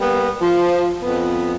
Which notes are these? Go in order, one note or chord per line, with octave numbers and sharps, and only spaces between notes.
G3 A#3 B3
F3
F2 B3